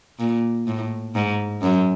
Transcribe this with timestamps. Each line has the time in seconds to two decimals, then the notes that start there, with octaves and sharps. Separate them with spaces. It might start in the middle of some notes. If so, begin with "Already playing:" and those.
0.19 A#2
0.67 A2
1.15 G#2
1.62 F#2